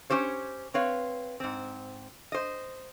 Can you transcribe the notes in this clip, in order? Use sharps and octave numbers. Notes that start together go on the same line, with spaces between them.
C#4 G4 C5 C#5
C4 B4 C#5 F5
G#2 C4
C5 D#5